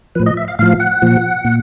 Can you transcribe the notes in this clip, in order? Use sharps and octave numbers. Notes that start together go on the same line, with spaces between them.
A2 F3 B4
D#5
E5
F5
A2 F3 F5
F#5
A#2 F3
A#2